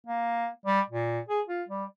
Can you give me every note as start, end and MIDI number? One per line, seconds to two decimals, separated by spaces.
0.07 0.48 58
0.66 0.81 55
0.90 1.20 46
1.29 1.41 68
1.48 1.63 65
1.68 1.84 55